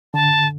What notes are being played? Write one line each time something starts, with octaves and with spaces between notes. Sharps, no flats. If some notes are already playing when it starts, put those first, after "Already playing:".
D3 A5